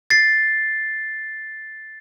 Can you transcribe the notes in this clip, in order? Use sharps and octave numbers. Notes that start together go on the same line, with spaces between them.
A6 C7